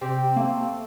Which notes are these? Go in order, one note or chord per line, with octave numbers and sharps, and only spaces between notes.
C3 C4 G4
A3 A#3